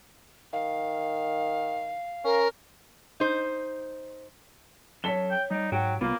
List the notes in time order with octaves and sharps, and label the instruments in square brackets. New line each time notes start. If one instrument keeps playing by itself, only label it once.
[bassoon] D#3 [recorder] F5
[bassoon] C#4 [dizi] A#4
[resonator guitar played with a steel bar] D#4 C5
[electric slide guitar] F#2 A4 [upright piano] C#5 B6 G7
[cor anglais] G5
[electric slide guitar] G3 D5 [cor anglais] D#4
[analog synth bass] G#2 [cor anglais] F#3 [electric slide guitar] F#4 G5
[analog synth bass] C2 [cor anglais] A#3 [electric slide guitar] B3 F4